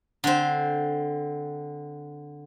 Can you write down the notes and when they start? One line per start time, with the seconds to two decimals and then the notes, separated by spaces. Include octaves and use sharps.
0.24 D3 C4 C5